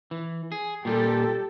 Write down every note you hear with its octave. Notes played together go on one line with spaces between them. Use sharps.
E3
G#4
A#2 G3 G4 A4